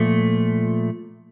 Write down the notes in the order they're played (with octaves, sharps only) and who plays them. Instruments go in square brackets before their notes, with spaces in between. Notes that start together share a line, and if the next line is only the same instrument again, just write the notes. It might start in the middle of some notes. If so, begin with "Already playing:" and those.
Already playing: [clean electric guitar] A#2 F3 A3